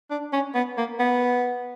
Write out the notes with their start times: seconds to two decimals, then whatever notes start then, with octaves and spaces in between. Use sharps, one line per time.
0.11 D4
0.33 C#4
0.55 B3
0.77 A#3
1.00 B3